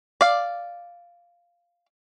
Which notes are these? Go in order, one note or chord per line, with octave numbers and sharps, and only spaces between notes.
D5 F5